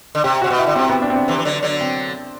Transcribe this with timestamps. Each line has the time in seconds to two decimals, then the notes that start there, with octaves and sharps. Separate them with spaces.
0.15 D3
0.24 C3 G4
0.42 C3 F#4
0.50 B2
0.58 E4
0.67 D3
0.75 C3 C4
0.90 B3
1.02 D4
1.10 C4
1.16 D4
1.28 C3 E3
1.38 E3
1.45 D3 F#3
1.63 D3 F#3
1.81 C4